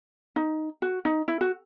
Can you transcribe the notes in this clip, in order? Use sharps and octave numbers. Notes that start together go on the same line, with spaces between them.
D#4
F#4
D#4
E4
F#4